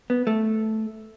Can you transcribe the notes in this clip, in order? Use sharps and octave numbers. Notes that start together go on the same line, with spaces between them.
B3
A3